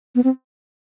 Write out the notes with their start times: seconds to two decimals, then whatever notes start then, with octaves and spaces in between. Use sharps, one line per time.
0.15 B3
0.24 C4